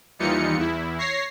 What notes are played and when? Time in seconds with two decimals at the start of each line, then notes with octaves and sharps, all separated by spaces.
0.19 D#2 E3 G3 D#4 F4 C#7
0.56 E2 E4
0.98 C#5 A#6 C7